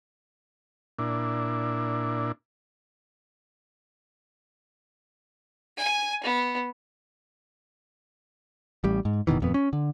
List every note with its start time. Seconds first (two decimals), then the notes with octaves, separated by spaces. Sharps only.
0.99 A#2 D4 E4
5.77 G#5
6.23 B3
8.84 A1 G3
9.05 G#2
9.27 F#1 B2 D#3 E3
9.40 D#1 F2 B3
9.54 C#4
9.73 D3